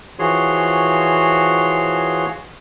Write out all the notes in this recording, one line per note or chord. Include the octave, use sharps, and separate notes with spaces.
E3 F3 F#4 G#4 C#5 C6